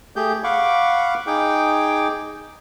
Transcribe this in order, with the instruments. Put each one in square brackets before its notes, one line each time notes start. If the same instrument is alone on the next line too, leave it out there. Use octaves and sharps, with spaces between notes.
[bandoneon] A3 G4 G#4 G6
F5 F#5 B5 C#6 D6
D#4 G#4 G5 D6